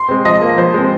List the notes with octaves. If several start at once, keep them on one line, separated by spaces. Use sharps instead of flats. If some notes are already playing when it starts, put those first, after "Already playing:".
Already playing: C6
G#3 C4
F3 D#5
A#3 F4
F3 C5
G#3 C4